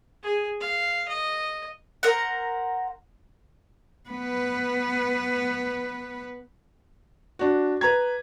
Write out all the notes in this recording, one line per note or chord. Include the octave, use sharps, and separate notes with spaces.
G#4
F5
D#5
A#4 C5 F#5
B3 B4
D4 F#4
B4 A#5 G#6